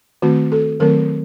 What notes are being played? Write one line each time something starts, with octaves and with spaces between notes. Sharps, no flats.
D#3 A3 C4 F#4
A4
D#3 F#3 A3 C4 A#4